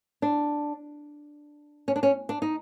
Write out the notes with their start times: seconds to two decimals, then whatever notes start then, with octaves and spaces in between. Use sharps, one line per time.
0.22 D4
1.88 C#4
1.96 D4
2.03 C#4
2.29 D4
2.42 D#4